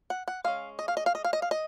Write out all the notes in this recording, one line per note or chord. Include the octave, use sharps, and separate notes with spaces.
F#5
F#5
G#3 C#4 F5
D#5
F5
D#5
F5
D#5
F5
D#5
F5
D#5